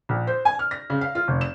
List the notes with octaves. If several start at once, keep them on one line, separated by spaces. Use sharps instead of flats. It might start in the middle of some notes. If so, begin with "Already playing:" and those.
A#1
C5
G#5
F6
A#6
C#3
F5
F4
F1
E7